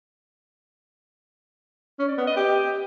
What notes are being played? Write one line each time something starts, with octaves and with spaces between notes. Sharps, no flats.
C#4
D5
B3
D#5
G4